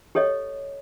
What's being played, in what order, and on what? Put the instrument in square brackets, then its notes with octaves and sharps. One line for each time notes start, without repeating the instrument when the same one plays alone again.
[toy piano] G4 A4 C#5 D#5